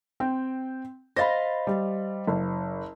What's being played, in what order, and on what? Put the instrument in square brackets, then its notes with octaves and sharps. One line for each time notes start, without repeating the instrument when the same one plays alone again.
[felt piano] C4 G5
[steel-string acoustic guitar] C5 D#5 F5 [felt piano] B5 A6 A#6
[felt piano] G3
F#1